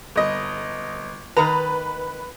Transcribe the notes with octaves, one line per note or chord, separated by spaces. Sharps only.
G1 D#5
D#3 B4 A#5